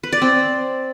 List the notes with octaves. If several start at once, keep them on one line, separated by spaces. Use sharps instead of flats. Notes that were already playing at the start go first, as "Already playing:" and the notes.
B4
D5
C4